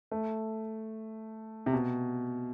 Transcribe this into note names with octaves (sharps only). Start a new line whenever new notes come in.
A3
C3
B2